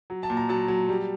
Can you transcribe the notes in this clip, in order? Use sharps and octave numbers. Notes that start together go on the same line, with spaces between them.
F#3
A5
A#2
A#5
F#3 A5
F#3
G3